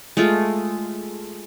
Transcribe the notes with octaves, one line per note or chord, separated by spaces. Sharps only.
G#3 A3 F4